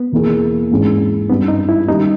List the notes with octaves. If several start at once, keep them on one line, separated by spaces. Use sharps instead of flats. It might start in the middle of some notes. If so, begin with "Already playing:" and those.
Already playing: B3
E2 B2 A#3 E4 G#4
G#2 E3 G#3 C#4 G#4
G2 G3 B3 C#4 G4
D#4
E4
D#3 G3 C#4 D#4 G4